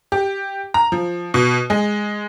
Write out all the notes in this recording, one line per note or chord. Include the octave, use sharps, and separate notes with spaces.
G4
A#5
F3
B2
G#3